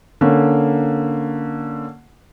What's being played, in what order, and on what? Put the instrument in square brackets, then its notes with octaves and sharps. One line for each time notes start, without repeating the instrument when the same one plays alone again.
[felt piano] D3 A#3 C#4